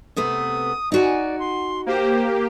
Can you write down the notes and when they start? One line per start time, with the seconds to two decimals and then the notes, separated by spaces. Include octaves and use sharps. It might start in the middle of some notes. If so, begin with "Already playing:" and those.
0.16 C3 A3 B3 D#6
0.92 D#4 F#4 D5 G#5
1.39 C6
1.86 A#3 G4 C5